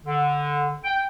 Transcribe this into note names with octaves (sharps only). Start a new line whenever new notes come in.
D3
G5